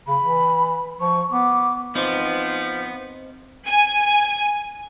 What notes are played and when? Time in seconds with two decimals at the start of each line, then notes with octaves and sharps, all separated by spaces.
0.08 C#3 B5
0.22 E3
1.01 F3 C#6
1.31 B3 D6
1.95 F3 B3 C4 D#4 C5
3.66 G#5